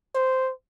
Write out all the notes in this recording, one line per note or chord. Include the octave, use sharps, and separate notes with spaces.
C5